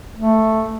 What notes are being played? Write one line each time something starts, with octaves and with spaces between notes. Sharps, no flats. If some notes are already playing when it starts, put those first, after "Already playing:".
A3